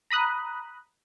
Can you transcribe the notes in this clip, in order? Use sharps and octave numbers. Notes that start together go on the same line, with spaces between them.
A#5 B5 D#6 F#6